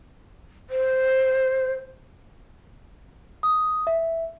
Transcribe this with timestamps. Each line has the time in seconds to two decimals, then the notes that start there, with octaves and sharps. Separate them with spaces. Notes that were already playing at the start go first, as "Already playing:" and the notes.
0.70 C5
3.43 D#6
3.87 E5